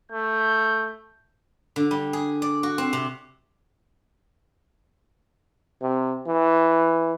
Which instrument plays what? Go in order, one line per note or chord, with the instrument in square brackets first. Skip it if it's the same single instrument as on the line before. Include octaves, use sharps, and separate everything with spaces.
[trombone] A3 [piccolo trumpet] G6
[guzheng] D3
G3
G#4
D5
F#4
C4
C3
[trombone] C3
E3